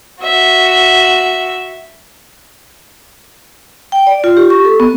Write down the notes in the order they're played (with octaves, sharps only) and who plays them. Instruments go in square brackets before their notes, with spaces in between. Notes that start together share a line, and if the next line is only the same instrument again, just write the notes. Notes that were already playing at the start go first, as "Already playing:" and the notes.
[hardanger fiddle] F#4 E5
[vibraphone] G5
D5
F4
G4
C#6
A4
B3